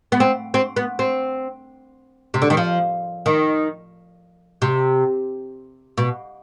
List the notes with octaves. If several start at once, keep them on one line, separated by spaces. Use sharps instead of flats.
B3
C4
C4
B3
C4
C3
D3
D#3
F3
D#3
C3
B2